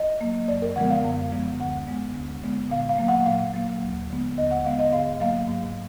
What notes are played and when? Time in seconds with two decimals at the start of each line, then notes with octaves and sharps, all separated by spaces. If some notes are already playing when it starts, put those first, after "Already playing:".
Already playing: D#5
0.21 F#3 A#3
0.48 F#2 D5
0.62 A#4
0.76 D3 F3 G#3 B3 F#5
0.90 F5
1.04 F#2
1.32 D3 F3 G#3 B3
1.60 D2 F#5
1.87 D3 G#3 B3
2.15 D2
2.44 D3 G#3 B3
2.70 A#2 F5
2.89 F5
2.98 F#3 A#3
3.08 F#5
3.26 A#2 F5
3.54 F#3 A#3
3.82 D#2
4.10 D3 G#3 B3
4.38 D#2 D#5
4.51 F#5
4.65 D3 G#3 B3 F5
4.79 D#5
4.93 G#2 F5
5.20 F#3 A#3 F5
5.48 G#2